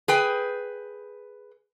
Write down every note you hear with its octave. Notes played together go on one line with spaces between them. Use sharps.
G#4 B4 G5